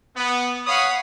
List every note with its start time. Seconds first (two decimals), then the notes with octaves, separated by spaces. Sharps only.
0.16 B3
0.67 C#5 F5 F#5 B5 D#6